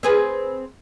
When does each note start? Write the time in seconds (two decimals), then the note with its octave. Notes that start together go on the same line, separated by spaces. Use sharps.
0.03 C4 G#4 B4